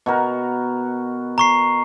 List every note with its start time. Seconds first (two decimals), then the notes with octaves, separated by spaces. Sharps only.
0.06 B2 F#4 A#4
1.38 A#5 C#6 C7